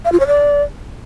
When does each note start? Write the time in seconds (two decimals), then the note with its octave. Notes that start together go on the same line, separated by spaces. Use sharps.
0.05 F5
0.12 F4
0.20 C#5
0.27 D5